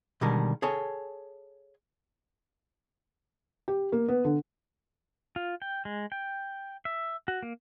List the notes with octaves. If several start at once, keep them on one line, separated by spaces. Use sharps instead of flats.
B2 D3 D#3 G3 G#3 A#4
G#4 A4 C#5 G#5
G4
A#3
B3
D3
F4
G5
G#3
G5
E5
F#4
A#3